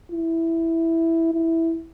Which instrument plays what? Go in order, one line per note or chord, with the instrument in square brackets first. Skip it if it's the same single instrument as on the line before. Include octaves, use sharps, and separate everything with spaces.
[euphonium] E4
E4